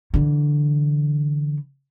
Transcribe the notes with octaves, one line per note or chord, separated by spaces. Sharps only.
D3 E3